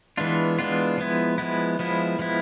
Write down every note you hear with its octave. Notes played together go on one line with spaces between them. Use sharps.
E3 G#3 B3 D4 F4
E3 G#3 B3 D4 F4
F3 G#3 B3 E4
F3 G#3 B3 E4
F3 G#3 B3 E4
F3 G#3 B3 E4